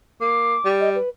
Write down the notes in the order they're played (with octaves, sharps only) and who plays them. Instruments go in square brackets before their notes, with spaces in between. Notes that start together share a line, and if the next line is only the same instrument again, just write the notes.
[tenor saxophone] A#3 [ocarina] D6
[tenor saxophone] G3
[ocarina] D#5
B4